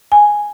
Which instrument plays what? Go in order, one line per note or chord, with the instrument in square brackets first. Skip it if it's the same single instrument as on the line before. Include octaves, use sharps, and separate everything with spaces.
[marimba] G#5